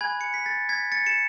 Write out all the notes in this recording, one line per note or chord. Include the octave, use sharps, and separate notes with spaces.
G#5 B5 F#6 G#6
C#7
B6
A6
G#6 B6
A6 C#7
C#7 E7